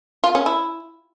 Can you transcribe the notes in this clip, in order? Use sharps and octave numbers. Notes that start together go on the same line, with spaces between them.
F4
C#4
E4